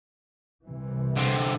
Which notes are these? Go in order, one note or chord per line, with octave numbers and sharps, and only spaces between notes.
C2 C3 E3
D3 C4